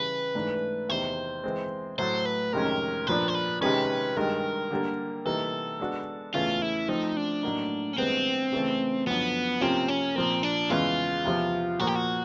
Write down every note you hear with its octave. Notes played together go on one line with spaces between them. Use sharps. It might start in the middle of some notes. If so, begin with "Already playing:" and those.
Already playing: C#3 E3 G3 B4
G#2 E3 A3 D4
E2 C3 D#3 C5
E3 G#3 C4
A2 F#3 A3 C5
B4
F2 C3 D#3 G#3 C#4 A#4
A#2 F3 A#3 D4 B4
C5
B4
C3 D#3 G#3 C#4 B4
G2 D#3 G#3 A#4
D3 G3 A#3
C3 E3 G3 A#3 D#4 A4
G#3 B3 D4 F#4
E2 C#3 E3 A3 C#4 F4
E4
F3 A3 C4 D#4
D4
A2 F#3 A#3 D#4
C#4
G2 E3 G#3 B3 C4
C#3 E3 A3
F#2 D3 F3 B3
C3 F3 A#3 C4 C#4 F4
C#4
A#2 F3 A#3 C4
D4
E2 C#3 E3 G#3 C#4 F4
E2 C3 F3
A#2 F3 A#3 F#4
G4
F#4